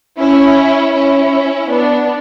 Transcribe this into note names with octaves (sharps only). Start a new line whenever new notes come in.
C#4 E4
C#4 E4
B3 D4